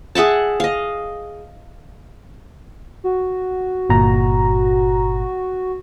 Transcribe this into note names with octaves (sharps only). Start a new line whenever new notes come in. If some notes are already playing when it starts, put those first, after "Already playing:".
G#4 E5 F#5 A5
D#5 F5
F#4
G1 A#2 A#5